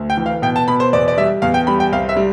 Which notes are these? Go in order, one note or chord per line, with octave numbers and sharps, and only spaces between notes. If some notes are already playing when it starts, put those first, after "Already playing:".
Already playing: D2
G5
E3
F5
B2 G5
A5
B2 B5
C5
E2 D5
D5
G3 E5
E2 F5
G5
G3 B5
G5
C2 F5
E5
G3